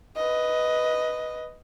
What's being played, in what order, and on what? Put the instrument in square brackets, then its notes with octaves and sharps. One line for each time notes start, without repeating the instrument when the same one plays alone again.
[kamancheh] B4 D#5